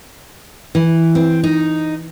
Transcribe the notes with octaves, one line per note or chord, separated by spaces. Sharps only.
E3
C4
D#4